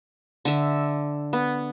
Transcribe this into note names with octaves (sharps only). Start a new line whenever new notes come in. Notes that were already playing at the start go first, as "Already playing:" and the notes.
D3 E5
B3